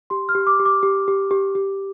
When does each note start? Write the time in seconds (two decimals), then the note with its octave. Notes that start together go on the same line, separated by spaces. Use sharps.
0.10 G4 C6
0.29 F6
0.35 G4
0.47 D6
0.60 G4
0.66 D6
0.83 G4
1.08 G4
1.31 G4
1.55 G4